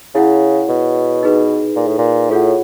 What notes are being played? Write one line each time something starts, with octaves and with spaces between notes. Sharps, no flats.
C#3 E4 G#4 C#5 F#5
B2
D#4 G#4 B4
A#2
A2
A#2
A2 F4 G#4 C#5 F#5